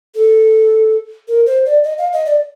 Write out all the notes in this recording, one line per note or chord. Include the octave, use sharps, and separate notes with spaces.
A4
A#4
C5
D5
D#5
F5
D#5
D5